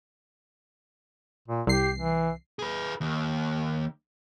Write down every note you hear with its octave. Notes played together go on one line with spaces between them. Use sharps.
A#2
C2 G4 C7
E3
G#4 B4
D#2